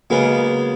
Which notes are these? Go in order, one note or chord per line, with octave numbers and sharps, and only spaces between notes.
C#3 F#3 G#3 A#3 B3